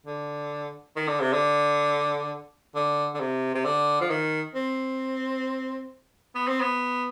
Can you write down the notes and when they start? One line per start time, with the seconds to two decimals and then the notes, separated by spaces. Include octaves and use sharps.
0.06 D3
0.96 D#3
1.08 D3
1.21 C3
1.33 D3
2.75 D3
3.15 D3
3.20 C3
3.55 C3
3.65 D3
4.01 F3
4.10 D#3
4.55 C4
6.35 B3
6.48 C4
6.61 B3